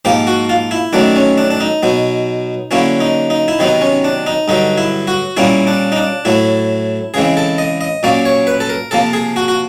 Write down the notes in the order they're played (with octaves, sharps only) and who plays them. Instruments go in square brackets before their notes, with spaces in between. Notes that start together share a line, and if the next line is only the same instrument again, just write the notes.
[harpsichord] G#2 F3 A#3 G4
F#4
F4
E4
F#2 D#3 F#3 A3 D4
C#4
D4
D4
D#4
B2 F#3 B3
D3 F#3 A#3 C#4 E4
D#4
D#4
E4
C3 D#3 F#3 B3 D#4
C#4
D4
D#4
G2 D3 F#3 D#4
E4
F#4
A#2 G3 A#3 C#4 E4
D4
D#4
D4
A2 F#3 A3 E4
C#3 E3 G#3 C4 G#4
A4
D#5
D#5
A#2 F#3 A#3 C#4 D5
C#5
B4
A4
A#4
C3 F3 A#3 A4
G#4
F#4
F#4